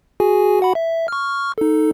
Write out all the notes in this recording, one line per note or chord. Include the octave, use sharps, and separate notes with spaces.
F#4 G#4 G#5
F#4 F#5 B5
E5
C#6 F6
D#4 A4